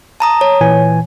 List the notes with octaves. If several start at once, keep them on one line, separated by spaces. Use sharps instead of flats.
A5 A#5 D#6
C#5
A#2 E3 G#5